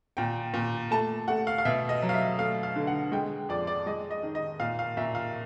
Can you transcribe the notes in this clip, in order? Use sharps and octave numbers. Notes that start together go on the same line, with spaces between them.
A#2 G5
A#2
A3 A5
A3 F#5
F5
F5
B2 E5
D#5
F#3
F5
E5
A3 F5
F5
D3
F#5
G#3 G5
F2 D5
D5
G#3 D#5
D#5
D#3
D#5
A#2 F5
F5
A#2 E5
F5